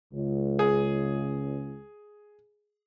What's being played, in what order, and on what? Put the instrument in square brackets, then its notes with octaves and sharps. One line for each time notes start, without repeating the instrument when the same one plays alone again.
[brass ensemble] C#2
[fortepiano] G#4